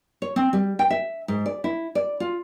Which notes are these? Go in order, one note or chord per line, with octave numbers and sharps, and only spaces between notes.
C#5
C4
G3
G5
E5
G#2
D5
E4
D5
F4